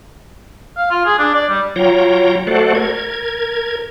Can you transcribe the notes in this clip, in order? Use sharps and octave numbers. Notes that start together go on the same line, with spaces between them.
F5
F4
G#4
D4
D5
G3
F#3 F4 C#5 G5 A#5
A3 F#4 A4 C5 D5 F#5
A#4 G#6